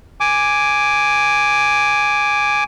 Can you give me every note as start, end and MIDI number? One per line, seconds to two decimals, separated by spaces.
0.20 2.64 80
0.20 2.64 86